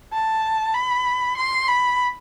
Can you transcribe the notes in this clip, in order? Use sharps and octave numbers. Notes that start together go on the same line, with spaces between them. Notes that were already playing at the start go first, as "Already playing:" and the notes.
A5
B5
C6
B5